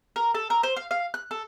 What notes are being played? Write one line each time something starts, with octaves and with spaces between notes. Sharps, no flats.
A#4
A4
A#4
C5
F5
F5
F#6
A4